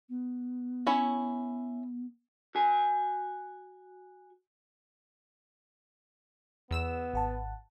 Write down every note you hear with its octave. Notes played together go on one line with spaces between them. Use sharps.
B3
C#4 E4 C#5
F#4 G#5
E2 B3 E6 E7
G#1 F#5 A5